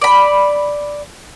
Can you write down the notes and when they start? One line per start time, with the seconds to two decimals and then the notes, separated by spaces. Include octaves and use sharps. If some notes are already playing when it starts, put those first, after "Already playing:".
0.01 D5 B5